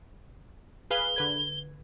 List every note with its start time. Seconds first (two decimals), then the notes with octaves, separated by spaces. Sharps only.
0.91 G#4 B4 F5 G7
1.16 D3 B4 G#6